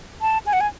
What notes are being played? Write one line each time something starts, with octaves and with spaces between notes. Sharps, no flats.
A5
G#5
F#5
G#5